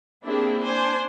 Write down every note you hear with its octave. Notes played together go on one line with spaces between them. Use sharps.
A#3 C4 D4 E4 G4 G#4
D4 C5 G#5